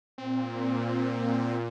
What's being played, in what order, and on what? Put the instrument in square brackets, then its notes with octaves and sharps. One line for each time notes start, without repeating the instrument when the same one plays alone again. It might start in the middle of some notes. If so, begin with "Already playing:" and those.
[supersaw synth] A#2 [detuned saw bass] C4